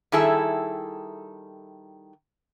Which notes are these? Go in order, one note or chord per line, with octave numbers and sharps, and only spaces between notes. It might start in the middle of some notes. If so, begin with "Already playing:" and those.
D#3 G3 E4 G#4 A4